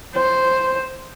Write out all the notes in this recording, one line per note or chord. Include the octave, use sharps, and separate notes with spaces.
C5